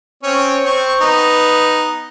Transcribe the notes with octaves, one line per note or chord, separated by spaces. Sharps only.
C4 C#4 C#5
C4 C#6
B3 D#4